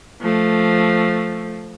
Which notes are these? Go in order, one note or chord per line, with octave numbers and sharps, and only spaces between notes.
F3 A3